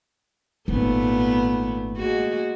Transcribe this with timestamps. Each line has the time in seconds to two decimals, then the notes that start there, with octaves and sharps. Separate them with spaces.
0.68 G#1 A#2 A3 B3
1.97 G#3 A#3 F#4